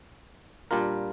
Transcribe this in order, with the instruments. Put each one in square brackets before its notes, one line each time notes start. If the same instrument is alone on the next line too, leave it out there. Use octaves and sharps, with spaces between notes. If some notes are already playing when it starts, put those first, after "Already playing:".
[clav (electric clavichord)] A#2 G3 D4 F4 A#4